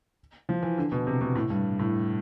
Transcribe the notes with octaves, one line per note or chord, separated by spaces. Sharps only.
F3
E3
D3
B2
C3
B2
A2
G2
A2